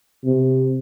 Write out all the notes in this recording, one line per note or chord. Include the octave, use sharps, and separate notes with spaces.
C3